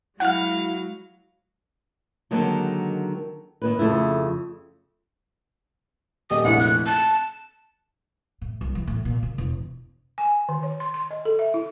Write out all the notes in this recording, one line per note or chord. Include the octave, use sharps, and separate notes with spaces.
F#3 G#3 E4 F#4 F5 F#5 F6
D3 D#3 F#3 G#3 A#3 C4
D#3 A#3 B4
F2 C#3 A3 E4
D#1 G4 D#5 D#6
F1 A#1 E4 F#5
F#6
A5 F#6
A2
C2
E3
A2
A#2
C#3
E1
G#5
D#3
C#5
C6
C6
D#5
A4
E5
E4